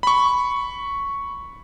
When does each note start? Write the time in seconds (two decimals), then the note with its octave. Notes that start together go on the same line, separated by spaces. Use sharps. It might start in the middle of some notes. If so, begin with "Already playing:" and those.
0.03 B5 C#6